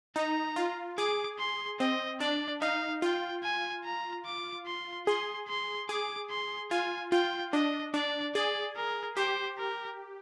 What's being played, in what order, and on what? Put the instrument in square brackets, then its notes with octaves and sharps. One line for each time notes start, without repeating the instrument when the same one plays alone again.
[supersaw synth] D#4 [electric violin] A#5
[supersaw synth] F4
[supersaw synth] G#4 [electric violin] D6
[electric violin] C6
[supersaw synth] C4 [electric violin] D#5
[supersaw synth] D4 [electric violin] D5
[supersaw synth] D#4 [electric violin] F5
[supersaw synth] F4 [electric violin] G5
[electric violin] G#5
A#5
D6
C6
[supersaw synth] G#4 [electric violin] C6
[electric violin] C6
[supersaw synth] G#4 [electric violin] D6
[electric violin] C6
[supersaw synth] F4 [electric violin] G#5
[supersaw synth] F4 [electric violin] G5
[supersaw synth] D4 [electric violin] D#5
[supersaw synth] D4 [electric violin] D5
[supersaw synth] G#4 [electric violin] D5
[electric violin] A#4
[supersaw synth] G4 [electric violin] C5
[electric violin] A#4